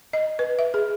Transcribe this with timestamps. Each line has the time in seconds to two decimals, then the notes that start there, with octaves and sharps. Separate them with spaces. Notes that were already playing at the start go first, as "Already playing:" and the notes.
0.13 D#5
0.39 B4
0.59 E5
0.74 G#4